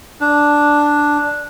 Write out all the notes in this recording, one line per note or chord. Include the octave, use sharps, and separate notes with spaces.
D4